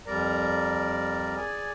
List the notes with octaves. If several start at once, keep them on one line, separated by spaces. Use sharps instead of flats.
F2 G3 A#4 D5 A#5
G#4 D5 G#5